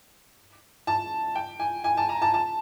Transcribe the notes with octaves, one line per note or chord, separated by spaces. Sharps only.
A5
G5
G#5
G#5
A5
A#5
A5
A5